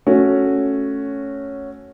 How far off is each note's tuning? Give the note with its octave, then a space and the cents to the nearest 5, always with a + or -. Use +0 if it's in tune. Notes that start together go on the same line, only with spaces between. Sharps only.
A3 +0 C#4 +0 F#4 +0